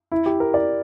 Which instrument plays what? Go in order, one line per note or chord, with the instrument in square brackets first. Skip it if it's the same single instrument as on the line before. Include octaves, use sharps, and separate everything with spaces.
[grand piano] E4
G4
A#4
D5